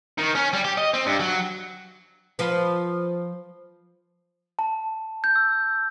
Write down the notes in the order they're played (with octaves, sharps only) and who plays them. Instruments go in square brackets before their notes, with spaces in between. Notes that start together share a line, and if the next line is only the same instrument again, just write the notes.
[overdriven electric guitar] D#3
C#4
G3
G4
D#5
C4
G2
F#3
[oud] F3 B4
[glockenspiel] A5
G6
E6